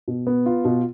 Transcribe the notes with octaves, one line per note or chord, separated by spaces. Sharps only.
B2
B3
F4
B2